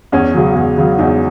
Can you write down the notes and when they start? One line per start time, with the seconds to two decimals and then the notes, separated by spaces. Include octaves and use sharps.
0.12 E2 C#4
0.34 C#3 F#3
0.55 E2
0.77 C#3 F#3
0.99 E2 D#4